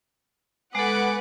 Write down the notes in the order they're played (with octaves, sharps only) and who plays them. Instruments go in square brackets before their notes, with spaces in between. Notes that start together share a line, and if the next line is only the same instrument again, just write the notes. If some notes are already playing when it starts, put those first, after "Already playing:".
[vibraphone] G#3 A4 [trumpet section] B3 G#5 D6 [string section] B4 F#5